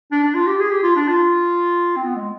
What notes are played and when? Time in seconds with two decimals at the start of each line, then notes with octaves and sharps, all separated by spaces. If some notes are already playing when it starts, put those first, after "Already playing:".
0.12 D4
0.23 D4
0.35 F4
0.47 G4
0.60 G#4
0.71 G4
0.83 F4
0.96 D4
1.08 F4
1.96 C4
2.04 B3
2.16 G#3